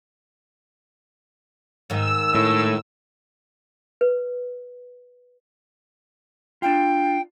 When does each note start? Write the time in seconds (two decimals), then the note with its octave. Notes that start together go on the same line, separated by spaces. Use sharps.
1.90 G#2 D#3 E6
2.34 A2
4.01 B4
6.62 D4 F4 G5